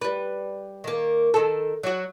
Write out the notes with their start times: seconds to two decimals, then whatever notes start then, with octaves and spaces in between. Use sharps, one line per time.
0.01 G3 B4
0.84 D#3 A#3
1.34 D#3 A4
1.83 F#3 F#4